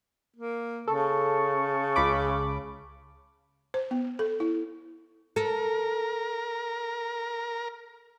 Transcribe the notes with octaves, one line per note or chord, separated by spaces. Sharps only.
A#3
C#3 A4 A5 C#6
C#2 B5 D6
C5
B3
A4
E4
A4 A#4